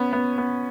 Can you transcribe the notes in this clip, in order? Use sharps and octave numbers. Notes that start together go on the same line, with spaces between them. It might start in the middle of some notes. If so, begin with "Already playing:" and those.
Already playing: B3 C#4
B3
B3